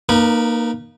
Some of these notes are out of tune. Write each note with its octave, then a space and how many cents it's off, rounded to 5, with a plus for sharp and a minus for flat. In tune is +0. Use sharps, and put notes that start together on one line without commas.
A#3 +0 D#4 -25 B4 -25